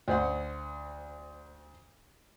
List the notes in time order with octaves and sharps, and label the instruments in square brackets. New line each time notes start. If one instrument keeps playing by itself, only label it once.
[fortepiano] D2 C5 F#5